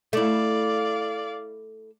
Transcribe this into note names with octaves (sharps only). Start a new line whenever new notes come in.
A3 E4 D5 F5